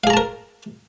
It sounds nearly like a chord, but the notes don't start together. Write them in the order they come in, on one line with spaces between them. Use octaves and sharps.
F5 G#4 A#5 A5 A#4